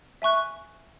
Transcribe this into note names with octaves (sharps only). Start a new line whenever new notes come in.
E5 G#5 C#6 F#6